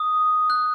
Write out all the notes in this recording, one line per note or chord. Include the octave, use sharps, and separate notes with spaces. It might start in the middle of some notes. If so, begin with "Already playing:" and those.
Already playing: D#6
F#6